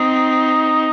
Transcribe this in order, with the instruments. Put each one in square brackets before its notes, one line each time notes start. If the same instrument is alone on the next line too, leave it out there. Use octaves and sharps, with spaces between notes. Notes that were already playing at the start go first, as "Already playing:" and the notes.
Already playing: [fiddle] C4 [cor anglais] D#4